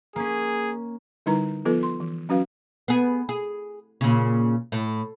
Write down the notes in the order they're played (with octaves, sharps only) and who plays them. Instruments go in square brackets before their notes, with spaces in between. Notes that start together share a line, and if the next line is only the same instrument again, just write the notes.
[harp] A#3 C#4 [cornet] G#4
[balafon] D3 G3 D#4 E4 B4 A#5
F3 B3 F4 A4 B4
C6
E3
F#3 C#4 F#4 B4 F5
[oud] B3 G#4
G#4
A#2 C#3
A2